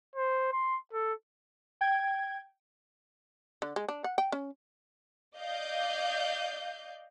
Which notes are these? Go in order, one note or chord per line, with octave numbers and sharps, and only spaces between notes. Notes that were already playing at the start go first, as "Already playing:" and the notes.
C5
C6
A4
G5 G#6
D3
G#3
D4
F#5
G5
C#4
D5 D#5 F5 G6